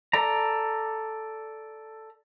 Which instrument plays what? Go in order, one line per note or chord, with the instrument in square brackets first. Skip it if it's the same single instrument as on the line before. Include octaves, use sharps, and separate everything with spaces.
[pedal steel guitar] A4 D5 A#5